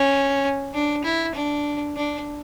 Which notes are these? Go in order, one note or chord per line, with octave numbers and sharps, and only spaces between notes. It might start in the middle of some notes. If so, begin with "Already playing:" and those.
Already playing: C#4
D4
E4
D4
D4